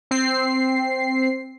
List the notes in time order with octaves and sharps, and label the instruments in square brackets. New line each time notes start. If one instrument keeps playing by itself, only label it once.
[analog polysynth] C4 C7